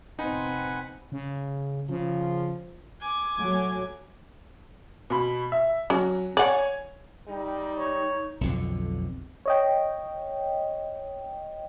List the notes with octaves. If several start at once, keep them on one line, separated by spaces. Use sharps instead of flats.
F1 B3 C4 D#4 B4 F#5 G#5
C#3
C#3 F3
G#5 D6
F#3 A3
B2 B5
E5
F#3 C#4
C#5 D5 F#5 G#5
G3 D#4
C#5
B1 F2 D3
C#5 D#5 G5